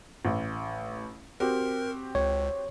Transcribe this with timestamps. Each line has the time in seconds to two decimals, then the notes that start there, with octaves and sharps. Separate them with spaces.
0.25 A1
1.40 C4 F#4 G4 A#4
2.15 C#2 C#5